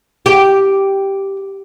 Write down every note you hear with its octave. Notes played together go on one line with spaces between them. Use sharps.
G4